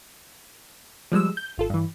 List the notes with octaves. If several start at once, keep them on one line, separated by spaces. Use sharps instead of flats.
F3 G3 G#3 E6
G6
G#1 F4 A4
G2 E3